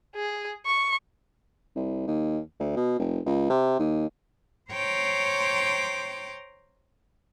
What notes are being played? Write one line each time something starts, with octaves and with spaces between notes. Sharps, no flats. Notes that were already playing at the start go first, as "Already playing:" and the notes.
G#4
C#6
C2
D#2
D2
B2
F1
C#2
C3
D#2
C5 C#5 G5 A#5 C6 D6